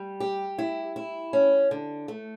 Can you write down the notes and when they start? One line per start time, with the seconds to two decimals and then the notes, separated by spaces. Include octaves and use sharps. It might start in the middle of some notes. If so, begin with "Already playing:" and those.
Already playing: G3
0.20 G4
0.59 E4
0.96 E4
1.33 C#4
1.71 D3
2.08 A3